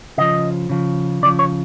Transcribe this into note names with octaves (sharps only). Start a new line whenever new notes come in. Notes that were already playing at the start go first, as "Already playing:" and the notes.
C#3 F3 D#5
C#3 F3
C#3 F3 D5
C#5